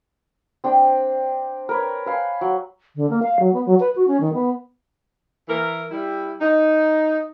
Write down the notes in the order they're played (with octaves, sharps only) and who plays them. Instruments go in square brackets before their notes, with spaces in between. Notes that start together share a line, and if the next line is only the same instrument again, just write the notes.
[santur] C4 D4 G5
A#4 B4 C#5
B4 F5 G#5
F#3
[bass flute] D3
A#3
F5
F#3
B3
F#3
B4
F#4
C#4
D#3
B3
[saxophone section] E3 A#4
G3 E4
D#4